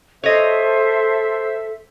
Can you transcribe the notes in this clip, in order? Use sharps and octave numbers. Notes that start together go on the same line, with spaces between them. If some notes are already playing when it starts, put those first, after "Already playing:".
A4 C5 C#5 D#5 E5